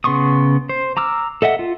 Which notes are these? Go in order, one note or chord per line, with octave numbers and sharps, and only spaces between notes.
C#3 B3 C6 C#6 D#6
C5
A#5 D6 E6 F6
A4 D#5 E5 F#5
F4